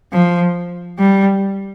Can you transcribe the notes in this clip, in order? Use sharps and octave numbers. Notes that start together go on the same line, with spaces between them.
F3
G3